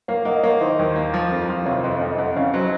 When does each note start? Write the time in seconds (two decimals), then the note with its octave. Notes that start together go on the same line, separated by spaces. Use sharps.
0.08 A#3 C#5 F5
0.25 A#3 D#5 F#5
0.36 D#5
0.43 A#3 C#5 F5
0.61 D#3 C5 D#5
0.79 D#2
0.96 A#3
1.14 F3
1.32 F2
1.49 F3
1.66 C3 C#5 F5
1.84 F2 C5 D#5
2.01 F2 C5 D#5
2.18 F2 D#5 F#5
2.36 C#3 C#5 F5
2.54 F#3 C5 D#5